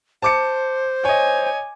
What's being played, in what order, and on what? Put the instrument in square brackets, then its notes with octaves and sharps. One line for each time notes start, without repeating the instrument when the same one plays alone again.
[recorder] C5 [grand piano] A5 D6 C#7
[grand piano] C#5 D#5 [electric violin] G#5